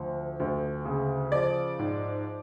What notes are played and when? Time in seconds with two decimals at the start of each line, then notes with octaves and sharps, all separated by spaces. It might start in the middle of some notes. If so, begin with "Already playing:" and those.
Already playing: D2 F3
0.40 D2
0.85 C#3
1.32 F3 D5
1.79 G#2